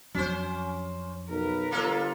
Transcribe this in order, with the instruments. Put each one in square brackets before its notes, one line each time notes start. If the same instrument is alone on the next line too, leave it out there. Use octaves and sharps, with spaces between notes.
[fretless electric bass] F2 F#3 [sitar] C#4 C5
[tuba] B1 [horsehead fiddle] A#4 B4
[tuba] G1 [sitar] A#3 F4 A4